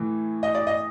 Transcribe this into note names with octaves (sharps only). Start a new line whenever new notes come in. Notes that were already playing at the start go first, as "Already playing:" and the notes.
Already playing: A2 E3
D#5
D5
D#5